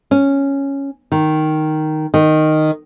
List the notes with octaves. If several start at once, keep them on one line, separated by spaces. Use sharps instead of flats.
C#4
D#3
D#3